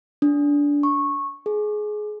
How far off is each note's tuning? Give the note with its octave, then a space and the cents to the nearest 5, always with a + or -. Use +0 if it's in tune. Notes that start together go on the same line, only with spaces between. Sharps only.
D4 -20
C#6 -15
G#4 +20